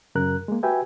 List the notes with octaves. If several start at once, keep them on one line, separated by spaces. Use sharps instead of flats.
F#2 C#3 A#4 F#6
G#3 A#3
F#4 G4 B4 E5 G5 G#5